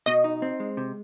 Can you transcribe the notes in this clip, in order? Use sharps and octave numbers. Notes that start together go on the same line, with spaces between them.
B2 D#5
D#4
C4
G#3
C3